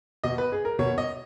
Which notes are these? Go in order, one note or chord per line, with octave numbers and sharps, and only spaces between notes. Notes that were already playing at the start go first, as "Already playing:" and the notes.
B2 D#5
B4
G#4
A#4
B2 C#5
D#5